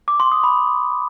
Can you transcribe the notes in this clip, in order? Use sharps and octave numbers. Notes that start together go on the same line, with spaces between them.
D6
C6
D#6
B5